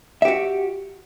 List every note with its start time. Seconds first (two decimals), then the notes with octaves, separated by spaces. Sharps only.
0.22 E5
0.25 G4
0.28 F#4